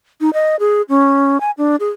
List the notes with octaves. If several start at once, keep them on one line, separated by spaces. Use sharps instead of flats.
D#4
D#5
G#4
C#4
G#5
D4
G#4